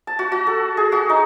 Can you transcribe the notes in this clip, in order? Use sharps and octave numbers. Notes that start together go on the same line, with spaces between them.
A5
F#4
F#4
A4
G#4
F#4
D#4